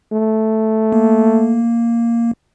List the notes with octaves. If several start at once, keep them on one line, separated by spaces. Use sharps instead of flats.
A3
A#3